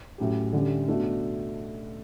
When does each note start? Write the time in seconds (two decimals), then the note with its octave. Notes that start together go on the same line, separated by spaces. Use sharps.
0.18 A2 F#3 C#4 G4
0.53 D3 G3 C#4 G4
0.88 B2 A3 D4 F#4